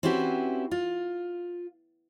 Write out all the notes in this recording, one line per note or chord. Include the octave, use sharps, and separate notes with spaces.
C4 C#4 E4 F#4 G4 B4
F4